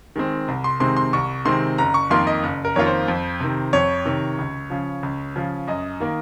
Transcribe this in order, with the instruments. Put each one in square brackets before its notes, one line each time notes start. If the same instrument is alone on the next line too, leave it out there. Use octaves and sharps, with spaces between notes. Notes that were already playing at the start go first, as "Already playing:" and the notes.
[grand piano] D#3 G#3 C4
C2
C6
C3 D#3 G#3 C4 C6
C6
C2 C#6
C3 D#3 G#3 C4 C6
F#1 A#5
C#6
F2 D#3 A#3 F4 C6
D#5
F#1
A#4
F2 D#3 A#3 F4 C#5
C5
F2
C3 D#3
F2 C#5
C3 D#3
C#2
C#3 F3
C#2
C#3 F3
F#2 D#5
D#3 A#3